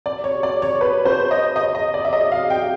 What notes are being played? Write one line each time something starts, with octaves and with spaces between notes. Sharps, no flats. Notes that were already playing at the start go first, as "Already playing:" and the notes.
D5
C#5
D5
C#5
B4
C5
D#5
D#5
D#5
D5
E5
D#5
F5
G5